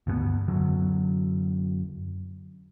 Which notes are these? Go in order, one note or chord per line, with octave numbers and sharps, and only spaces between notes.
D2 G2 A3 B3
F#2 D3 F#3